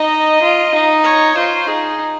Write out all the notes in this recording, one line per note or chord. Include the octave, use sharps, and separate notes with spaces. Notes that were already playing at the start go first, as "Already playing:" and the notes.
Already playing: D#4 D#5
F4
D#4
C#5
F4 C5
D#4 G#4